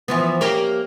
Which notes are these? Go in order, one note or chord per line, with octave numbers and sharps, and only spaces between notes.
E3 F3 B3
A#3 C#4 G4